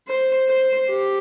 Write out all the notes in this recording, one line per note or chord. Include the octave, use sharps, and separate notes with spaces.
C5
C5
G4